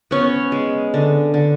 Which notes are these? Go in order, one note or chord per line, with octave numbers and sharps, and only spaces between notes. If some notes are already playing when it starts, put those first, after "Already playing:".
B3 C#4 C#5
G#3
D3
D3